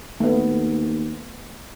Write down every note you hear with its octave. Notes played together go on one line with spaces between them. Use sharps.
D#2 A3 B3